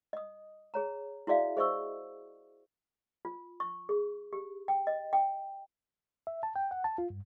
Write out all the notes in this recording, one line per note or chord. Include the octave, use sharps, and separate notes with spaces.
D#5 D#6
G#4 C#5 A#5
E4 F#4 G#4 D5 E5 F5
G#4 C5 D#5 E5 C#6 E6
F4
C#6
G#4
G4
G5
D#5
G5
E5
A5
G5
F#5
A5
F4
G2